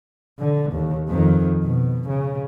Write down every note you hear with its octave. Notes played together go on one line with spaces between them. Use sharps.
D3
D#2
F2 D#3
B2
C#3